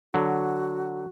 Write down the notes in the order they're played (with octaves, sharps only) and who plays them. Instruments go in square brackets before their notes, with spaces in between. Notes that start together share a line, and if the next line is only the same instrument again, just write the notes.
[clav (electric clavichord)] D3 F#3 [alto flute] F#4